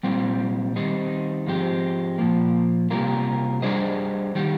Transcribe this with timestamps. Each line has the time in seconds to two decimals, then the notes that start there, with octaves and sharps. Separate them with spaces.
0.03 A#2 G3 C4
0.76 D#3 G3 C4 D#4
1.47 G#2 F3 G#3 C4 G4
2.18 A#2 F3 A#3
2.90 C3 G3 A#3 F4 A#4
3.62 G3 D4 G#4 C5 D#5
4.35 D#3 G3